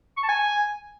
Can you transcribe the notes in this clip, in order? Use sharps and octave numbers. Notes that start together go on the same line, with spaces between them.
C#6
A5
G#5